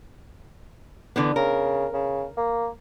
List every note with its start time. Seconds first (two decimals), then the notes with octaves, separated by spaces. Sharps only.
1.16 D3 E3 B3
1.36 C#3 A#4
1.93 C#3
2.37 A#3